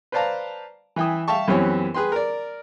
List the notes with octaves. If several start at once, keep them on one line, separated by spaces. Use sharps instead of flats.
B4 C5 D5 F5 A5 A#5
E3 E5 G5 G#5 D#6
E5 F5 G5 A5 C#6
F#2 E3 B3 C4 G4 C#5
G#4 B4 G5 C6
A#4 D5